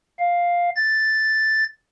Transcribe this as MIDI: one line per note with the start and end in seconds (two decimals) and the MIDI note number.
0.19 0.70 77
0.76 1.64 93